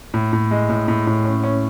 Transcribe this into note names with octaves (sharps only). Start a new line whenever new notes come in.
A2
A2
G#3
A2
A2
A2
C#4
C#4